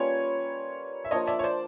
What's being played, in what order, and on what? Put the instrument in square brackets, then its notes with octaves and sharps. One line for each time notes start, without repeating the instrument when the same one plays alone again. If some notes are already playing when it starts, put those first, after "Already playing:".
Already playing: [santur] G3 A#3 C#4 F4 [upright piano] B4 C#5
[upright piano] E5
[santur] F3 A#3 D4 [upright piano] C#5 D#5
[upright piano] D5 E5
C#5
C5 D5